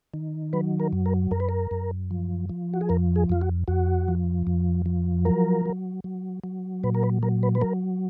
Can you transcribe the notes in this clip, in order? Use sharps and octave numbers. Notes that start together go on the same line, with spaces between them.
D#3
F#3 B4
A#4
F#2
A#4
F#2 A#4
B4
A#4
F#2
F3
F3
F#4
G#4
F2 A#4
G#4
F2 F4
F#4
F2 F#4
F3
F2
F3
F#3 A#4
F#3
F#3
F#3
A#2 B4
A#4
B4
F#3 A#4
B4
B4
F#3 A#4